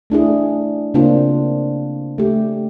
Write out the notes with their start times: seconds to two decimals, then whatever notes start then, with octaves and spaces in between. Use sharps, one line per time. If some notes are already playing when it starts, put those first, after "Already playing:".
0.10 A3 D4 E4 G#4
0.94 C#3 A#3 C4 D4 F4
2.18 A3 G4